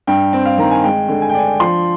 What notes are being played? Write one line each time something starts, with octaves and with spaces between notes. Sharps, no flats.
G2 G5
C4
F5
D#3 A#5
G#5
G#3 G5
D3
G#5
G5
D4 G#5
F3 C6